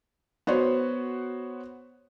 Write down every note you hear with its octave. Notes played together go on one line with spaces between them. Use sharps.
B3 F#4 C5 C#5